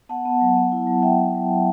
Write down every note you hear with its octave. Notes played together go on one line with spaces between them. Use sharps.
B3 F#5 A5
B3
F#3
B3
E4
F#3
F#3 E5 G5
F#3
F#3
B3